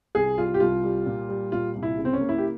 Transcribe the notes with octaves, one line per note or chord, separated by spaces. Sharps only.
C2 G#4
G3 F4
G4
C2 F4
G3
A#2
G3
A#2 F4
C2
E4
C#3
C4
C#4
A#3
E4
G4